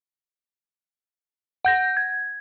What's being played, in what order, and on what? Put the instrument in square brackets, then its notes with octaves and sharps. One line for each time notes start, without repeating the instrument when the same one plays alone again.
[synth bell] F#5 G6 A#6
G#6